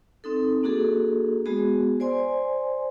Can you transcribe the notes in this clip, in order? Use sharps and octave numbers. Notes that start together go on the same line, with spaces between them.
C4 D#4 A4
A#3 D4 F#4 G#4 A4
G#3 B3 F#4 G#4
C5 D5 G#5 C6